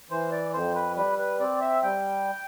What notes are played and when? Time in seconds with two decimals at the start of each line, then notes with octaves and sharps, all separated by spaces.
0.10 E3 C5
0.32 D5
0.53 F2 C5
0.75 B4
0.96 G3 B4
1.19 B4
1.40 C4 D5
1.61 E5
1.83 G3 G5